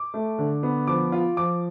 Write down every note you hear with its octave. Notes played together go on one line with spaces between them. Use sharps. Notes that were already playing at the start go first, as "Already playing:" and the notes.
Already playing: D6
A3
D3
B3
F3 D6
F4
F3 D6